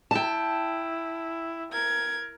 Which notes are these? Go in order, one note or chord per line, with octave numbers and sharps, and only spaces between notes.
E4 G5 A5
A#4 G#6